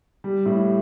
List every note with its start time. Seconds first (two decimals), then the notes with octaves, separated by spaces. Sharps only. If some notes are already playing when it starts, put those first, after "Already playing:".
0.24 G3
0.46 A2